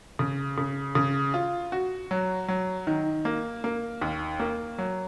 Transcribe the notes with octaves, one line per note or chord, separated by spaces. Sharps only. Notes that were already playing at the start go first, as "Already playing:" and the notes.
C#3
C#3
C#3
F4
F#4
F#3
F#3
D#3
A#3
A#3
D#2
A#3
F#3